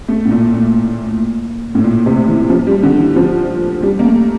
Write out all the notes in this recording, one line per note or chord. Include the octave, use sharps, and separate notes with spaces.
A3
A2
A#2
A#2
A2
A#2
C3
E3
F3
G3
D3
E3
F3
G3
A#3
A3